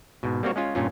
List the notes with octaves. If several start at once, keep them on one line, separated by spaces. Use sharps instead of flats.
G#2 B2
G3 A#3 C4 F#4 C#5
G#3 C#4 F4
G2 A#2 C#4 F4